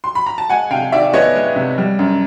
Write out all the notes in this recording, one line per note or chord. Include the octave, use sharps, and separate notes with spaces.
C6
B5
A#5
A5
G#3 F#5 G#5
C3 F5 G5
D#3 D5 E5
B3 C#5 D#5
G#3
C3
G3
F#2